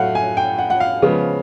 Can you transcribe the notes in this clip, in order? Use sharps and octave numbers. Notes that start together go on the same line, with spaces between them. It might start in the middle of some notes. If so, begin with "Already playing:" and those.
Already playing: A2 F#3 A3 F5 F#5
G#5
G5
F#5
F#5
F5
C#3 F3 G#3 B3